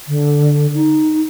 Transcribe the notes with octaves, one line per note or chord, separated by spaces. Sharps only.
D3
D#4